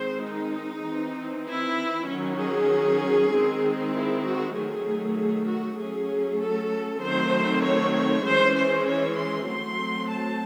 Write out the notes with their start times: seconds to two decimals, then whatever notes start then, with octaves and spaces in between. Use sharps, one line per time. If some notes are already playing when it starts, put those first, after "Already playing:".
Already playing: D#3 G#3 C4 C5
0.25 D#4
0.87 E3 C4
1.49 E4
2.10 D#3 F#3 C#4
2.40 G#4
3.33 D#3 G#3 C4
3.94 E4
4.25 F#4
4.56 D#3 F#3 A3 G#4
5.17 G#4
5.48 F#4
5.79 F#3 A3 C#4 G#4
6.41 A4
7.02 D#3 F#3 A3 C4 C5
7.64 C#5
8.25 E3 G#3 C#4 C5
8.56 C5
8.87 C#5
9.17 C6
9.48 F#3 A3 C4 C6
10.10 A5